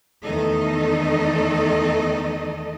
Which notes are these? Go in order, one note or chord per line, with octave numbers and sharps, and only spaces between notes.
E2 D#3 A3 D#4 A4 D#5